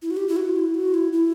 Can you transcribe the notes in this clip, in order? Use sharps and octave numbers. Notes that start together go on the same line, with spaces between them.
E4
F#4
G4
E4
F#4
E4
F#4
E4
E4